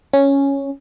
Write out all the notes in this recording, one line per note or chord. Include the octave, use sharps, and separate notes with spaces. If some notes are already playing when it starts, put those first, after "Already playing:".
C#4